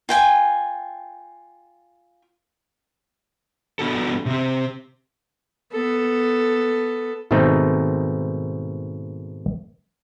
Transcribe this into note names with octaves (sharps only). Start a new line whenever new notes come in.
F4 G5 G#5
B3 D4 F#4 A4
C3 C4
B3 A4
G#2 B2 D#3 A3 C4 D#4